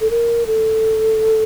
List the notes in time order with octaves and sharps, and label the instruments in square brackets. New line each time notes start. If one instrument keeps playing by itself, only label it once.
[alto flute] A4
A#4
A4